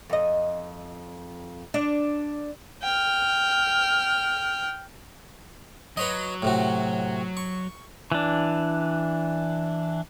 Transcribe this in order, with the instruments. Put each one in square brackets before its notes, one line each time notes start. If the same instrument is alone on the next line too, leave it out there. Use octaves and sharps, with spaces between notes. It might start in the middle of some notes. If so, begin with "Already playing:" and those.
[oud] F2 D#5
D4
[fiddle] G5 F6
[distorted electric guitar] F#3 [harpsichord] B4 C#5 D#5
[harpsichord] A2 C3 F#4
C#6
[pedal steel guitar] E3 D4